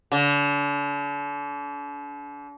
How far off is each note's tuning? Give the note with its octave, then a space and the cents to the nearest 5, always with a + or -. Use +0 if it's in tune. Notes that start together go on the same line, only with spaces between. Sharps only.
D3 -40